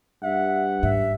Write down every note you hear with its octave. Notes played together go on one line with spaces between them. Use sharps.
G2 E5 F#5
G#2 E5